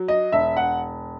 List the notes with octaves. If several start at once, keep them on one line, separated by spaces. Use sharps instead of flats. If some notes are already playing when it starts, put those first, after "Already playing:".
Already playing: F#3
D#5
E1 E5
F#5